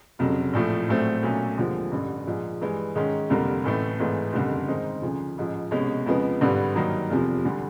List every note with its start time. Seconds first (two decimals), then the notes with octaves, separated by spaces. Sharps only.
0.19 F1 F2 C#3 F#3
0.53 A#1 A2 F3 A3
0.89 A#1 A2 F#3 A3 C4
1.23 B1 A#2 F#3 A3 C#4
1.57 D#2 D3 F3 G#3 C4
1.92 A1 G2 D3
2.27 A#1 G#2 F3
2.61 G2 E3 G#3
2.95 G#2 D#3 G#3 C#4
3.30 F1 F2 D3 G3 A#3
3.64 A1 A2 E3 A3
4.00 G#1 G#2 E3 A3
4.33 F#1 F2 D3 G3
4.68 G#2 D#3 G#3 C4 D#4
5.02 D2 C#3 F3
5.38 A1 G#2 F3
5.71 C2 B2 G#3 C#4
6.06 F2 C#3 F3 G#3 B3
6.41 G#1 G2 D3 G3 B3
6.75 G2 D#3 F#3 A#3 D#4
7.10 F1 E2 C3 F3
7.44 D2 D3 G3